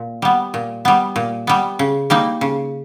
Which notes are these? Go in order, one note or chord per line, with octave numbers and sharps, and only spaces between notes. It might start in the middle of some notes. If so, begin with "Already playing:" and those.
Already playing: A#2
G3 B3
A#2
G3 B3
A#2
G3 B3
C#3
G3 A#3 D#4
C#3